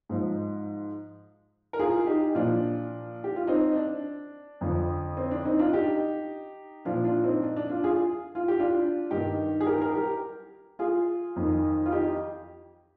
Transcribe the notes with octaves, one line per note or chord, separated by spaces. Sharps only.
G#2 F3
A#4
F4 G#4
D#4 G4
A#2 F3 D4 F4
G4
F4
C4 D#4
D4
F2 D3 F3
C4
D4
C4 D#4
D4 F4
D#4 G4
A#2 F3 D4 F4
D4 F4
C4 D#4
D4
D4
D4 F4
F4 G#4
F4
G4
D4 F4
G2 D#3 D#4 G4
G#4
G4 A#4
G4 A#4
G4 A#4
F4 G#4
F2 D#3
F4
D#4 G4